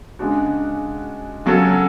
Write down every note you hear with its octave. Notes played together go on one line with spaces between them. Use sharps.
C#3 G#3 D4 F#4
C#3 F#3 C#4 F#4 A4